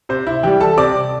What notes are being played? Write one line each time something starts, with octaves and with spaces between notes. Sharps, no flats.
C3 C5
E4 E5
E3 G3 G4 G5
A4 A5
C3 D5 D6